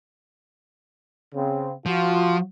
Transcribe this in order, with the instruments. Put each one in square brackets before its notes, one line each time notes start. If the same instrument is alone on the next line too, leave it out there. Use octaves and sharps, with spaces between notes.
[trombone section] C#3 C4
[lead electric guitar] F3 [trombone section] F4 F#4